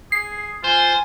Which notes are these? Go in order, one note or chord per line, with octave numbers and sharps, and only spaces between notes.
G#4 C7
F4 C5 G#5